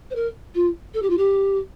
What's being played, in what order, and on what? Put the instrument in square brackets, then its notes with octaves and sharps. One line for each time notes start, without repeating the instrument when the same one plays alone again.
[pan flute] C5
A#4
F4
A4
G4
F4
G4